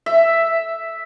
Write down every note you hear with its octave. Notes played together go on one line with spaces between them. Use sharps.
E5